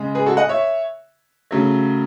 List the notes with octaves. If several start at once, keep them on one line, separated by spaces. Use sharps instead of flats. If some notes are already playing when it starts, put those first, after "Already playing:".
Already playing: C#3 G#3
G#4 B4
F#4 A4
D#5 F#5
C#5 E5
C#3 F#3 A3